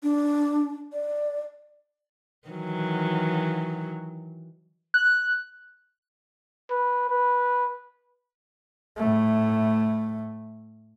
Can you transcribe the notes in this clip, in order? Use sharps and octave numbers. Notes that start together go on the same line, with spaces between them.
D4
D5
D#3 E3 F#3
F#6
B4
B4
A2 A3